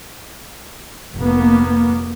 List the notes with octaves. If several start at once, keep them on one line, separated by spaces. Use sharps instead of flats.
F1 A#3 B3